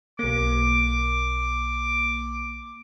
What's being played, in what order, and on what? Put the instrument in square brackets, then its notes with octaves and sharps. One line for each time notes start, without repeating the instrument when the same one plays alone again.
[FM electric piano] B1 A#3 [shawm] D6